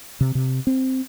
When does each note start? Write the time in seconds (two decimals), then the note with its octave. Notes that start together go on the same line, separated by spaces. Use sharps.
0.21 C3
0.35 C3
0.67 C4